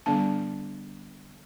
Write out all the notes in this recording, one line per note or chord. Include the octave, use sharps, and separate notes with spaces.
D3 G3 B3 D4 A5